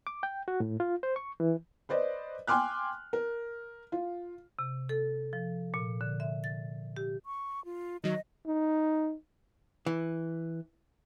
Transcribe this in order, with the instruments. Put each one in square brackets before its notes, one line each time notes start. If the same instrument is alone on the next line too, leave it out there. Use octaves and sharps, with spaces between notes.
[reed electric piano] D6
G5
F#4
A2
F4
C5
C#6
E3
[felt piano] B4 C5 D5 D#5
G5 G#5 C6 D6 F6 F#6
A#4
F4
[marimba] C3
A4
F3
A#2
D3
E5
A6
G4
[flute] C#6
F4
[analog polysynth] D#3 F#3 [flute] D#5
[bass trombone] D#4
[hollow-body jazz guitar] E3